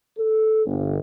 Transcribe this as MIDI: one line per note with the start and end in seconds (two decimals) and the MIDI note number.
0.18 0.63 69
0.66 0.98 31